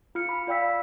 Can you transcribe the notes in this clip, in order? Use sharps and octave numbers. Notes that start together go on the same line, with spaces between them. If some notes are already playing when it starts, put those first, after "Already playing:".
F4 F6 C#7
B5
F4 D5 F5 G5 E6 B6